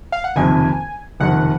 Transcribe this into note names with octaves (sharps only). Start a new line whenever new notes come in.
F5
F#5
F#1 F2 C3 D#3 G#5
F#1 F2 C3 D#3 F#5